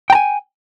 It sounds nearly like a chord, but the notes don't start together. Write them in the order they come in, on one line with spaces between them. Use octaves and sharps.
G5 A#5 G#5